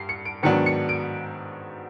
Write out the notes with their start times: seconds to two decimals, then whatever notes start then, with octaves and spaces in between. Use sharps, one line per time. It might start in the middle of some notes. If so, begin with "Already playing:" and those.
Already playing: G2 C7
0.09 C#7
0.25 D7
0.43 G#2 D#3 F#3 B3 D4 C#7
0.66 C#7
0.89 D7